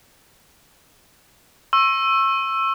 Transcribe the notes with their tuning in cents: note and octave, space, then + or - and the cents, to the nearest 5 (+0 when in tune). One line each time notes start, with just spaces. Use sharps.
C#6 -35 E6 +10